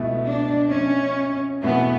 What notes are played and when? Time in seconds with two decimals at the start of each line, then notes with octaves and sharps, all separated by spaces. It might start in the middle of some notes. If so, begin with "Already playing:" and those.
Already playing: C#2 B2 A3 E4
0.25 D4
0.71 C#4
1.63 E2 B2 A3 B3